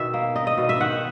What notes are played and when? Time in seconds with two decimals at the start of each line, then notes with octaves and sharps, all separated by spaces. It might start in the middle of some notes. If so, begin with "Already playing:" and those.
Already playing: B2 D#3 E5
0.14 A#3
0.35 D#4 D#5
0.47 D#5
0.58 B2
0.69 E5
0.80 D#3 F#5